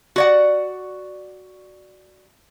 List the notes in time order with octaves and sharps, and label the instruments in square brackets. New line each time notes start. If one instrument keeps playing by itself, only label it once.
[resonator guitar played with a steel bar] F#4 D5 F#5